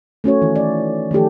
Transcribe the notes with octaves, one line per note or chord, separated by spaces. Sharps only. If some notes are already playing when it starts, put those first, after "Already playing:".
A3 C#4 F#4 C#5
D#3 E3
D5
D#3 F3 A3 G4 A4